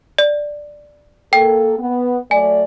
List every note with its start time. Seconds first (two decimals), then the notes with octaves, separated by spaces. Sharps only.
0.18 D5
1.33 A#3 A4 G5
1.78 B3
2.31 F#3 A3 D5 G#5